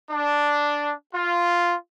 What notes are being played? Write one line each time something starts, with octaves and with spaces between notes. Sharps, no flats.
D4
F4